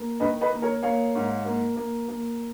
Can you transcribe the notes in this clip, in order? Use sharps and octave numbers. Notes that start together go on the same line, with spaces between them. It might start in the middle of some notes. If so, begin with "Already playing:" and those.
Already playing: A#3
D#3 B4 D#5
B4 D#5
A#3
A#4 C#5
A#3 C#5 F5
G#2
A#3
A#3
A#3